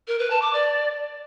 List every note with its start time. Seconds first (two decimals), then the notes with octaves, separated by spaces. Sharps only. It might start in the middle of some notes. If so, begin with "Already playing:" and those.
0.07 A#4
0.19 B4
0.30 A5
0.41 D6
0.53 D5